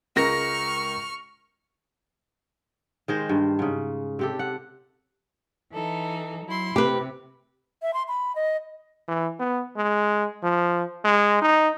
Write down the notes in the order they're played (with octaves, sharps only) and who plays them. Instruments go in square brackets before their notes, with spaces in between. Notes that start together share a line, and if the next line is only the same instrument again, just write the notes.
[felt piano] C#2 A#4 A#6 [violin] C#6 F6
[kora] D#3 G#3 C5
G2
G#2 C#3
C3 G4 A4
F#5
[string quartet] E3 D#4 A4
F#3 E4 C6
[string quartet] C3 [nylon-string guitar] G4 B4
[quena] E5
C6
B5
D#5
[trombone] E3
B3
G#3
F3
G#3
D#4